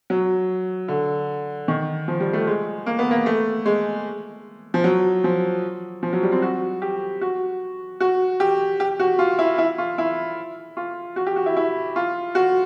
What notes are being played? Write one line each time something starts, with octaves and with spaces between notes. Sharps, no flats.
F#3
D3
D#3
F3
G3
A3
G#3
A#3
B3
A#3
A3
G#3
F3
F#3
F3
F3
F#3
G3
C4
F#4
G4
F#4
F#4
G4
G4
F#4
F4
E4
E4
F4
E4
F4
F#4
G4
F#4
E4
E4
F4
F#4